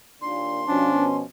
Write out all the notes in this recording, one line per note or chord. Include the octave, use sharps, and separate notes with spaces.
D#2 A#2 D4 C6
B2 F3 C#4 D4